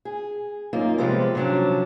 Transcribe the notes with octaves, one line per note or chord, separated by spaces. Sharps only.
G#4
F#2 A#3 D#4 F4
C3 F3 G3 G#3 B3 C4
C3 F3 F#3 C#4 D4